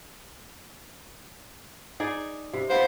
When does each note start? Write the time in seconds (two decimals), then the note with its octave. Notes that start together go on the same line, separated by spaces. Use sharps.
2.00 D#4 G#4 D5
2.53 C3
2.70 A#3 B3 D#4 C5